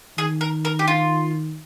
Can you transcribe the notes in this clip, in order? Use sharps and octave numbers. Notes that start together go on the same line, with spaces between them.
D#3 G#4
A#4
A#4
G4
F4